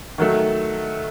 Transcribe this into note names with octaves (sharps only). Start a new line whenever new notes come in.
D#3 F#3 A3